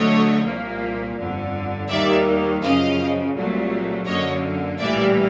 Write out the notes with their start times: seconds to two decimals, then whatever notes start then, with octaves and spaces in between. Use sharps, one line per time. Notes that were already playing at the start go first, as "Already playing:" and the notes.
Already playing: D2 D3 F#3 A3 C#5 D#5
0.44 C2 A#2 F3 A#3
1.17 G1 F2 D3
1.89 D#2 D#3 G3 A#3 D5 E5
2.61 F#2 C#3 F3 D#5 F5
3.35 C2 A#2 F#3 A3
4.06 F#2 D3 F#3 A#3 C#5 D#5
4.79 A#1 A2 E3 G3 A#3 D5 E5